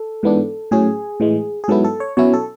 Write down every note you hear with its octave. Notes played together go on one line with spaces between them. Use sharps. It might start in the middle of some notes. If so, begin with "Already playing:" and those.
Already playing: A4
G#2 E3 B3 D4
A2 F#3 C#4 G#4
A2 E3 G#3
G#4
G#2 F#3 B3 E4 A4
A4
C#5
B2 F#3 C#4 E4 C#5
A4